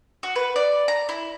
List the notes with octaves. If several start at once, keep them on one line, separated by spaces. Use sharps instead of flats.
F#4
B4
D5
A#5
E4